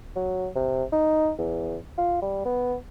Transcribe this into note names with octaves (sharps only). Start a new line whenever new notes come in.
F#3
C3
D#4
E2
F4
G3
B3